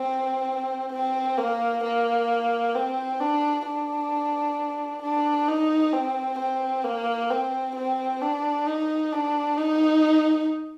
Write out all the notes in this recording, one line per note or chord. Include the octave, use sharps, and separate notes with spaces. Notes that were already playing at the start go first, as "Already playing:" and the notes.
Already playing: C4
C4
A#3
A#3
C4
D4
D4
D4
D#4
C4
C4
A#3
C4
C4
D4
D#4
D4
D#4